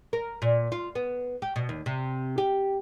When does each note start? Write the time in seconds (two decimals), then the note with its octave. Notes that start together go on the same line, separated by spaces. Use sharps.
0.13 A#4
0.42 A#2
0.72 F4
0.95 B3
1.42 G4
1.56 B2
1.69 D#2
1.86 C3
2.38 G4